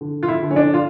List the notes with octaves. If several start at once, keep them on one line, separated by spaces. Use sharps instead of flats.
D3
F4
E4
D3
C#4
D4
F4